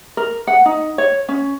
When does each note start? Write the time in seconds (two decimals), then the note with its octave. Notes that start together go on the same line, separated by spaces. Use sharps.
0.17 A#4
0.47 F#5
0.66 D#4
0.98 C#5
1.29 C#4